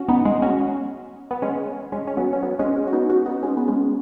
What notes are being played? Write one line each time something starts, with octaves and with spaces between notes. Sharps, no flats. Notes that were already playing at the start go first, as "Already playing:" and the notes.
Already playing: C#4 F#4
B3 D#4
G#3
C#4 F#4
B3
G#3 C#4
G#3 C#4
C#4
F#3 B3
C#4
F#3 B3
G#3 C#4
G#3 C#4
F#4
B3 D#4
C#4 F#4
B3 D#4
G#3 C#4
B3
G#3 C#4